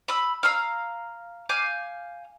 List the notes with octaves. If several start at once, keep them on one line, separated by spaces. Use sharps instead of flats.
B5 E6
F5 A#5 E6 F6
F5 G#5 D6 G6